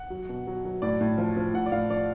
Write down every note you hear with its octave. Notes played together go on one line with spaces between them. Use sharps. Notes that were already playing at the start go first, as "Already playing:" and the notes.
Already playing: F#5
F#3
B2
F#3
F#3
A2 D5
A2
F3
F3
A2 F#5
D5
A2 F5
F3 D5